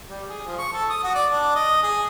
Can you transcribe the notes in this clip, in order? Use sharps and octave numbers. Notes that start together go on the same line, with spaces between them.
G3
G#4
F3
C#6
A4
D#6
F#4
D5
D4
D#5
G#4